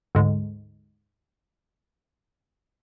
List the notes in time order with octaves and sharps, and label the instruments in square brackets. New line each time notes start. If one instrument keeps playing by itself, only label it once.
[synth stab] D2 G#2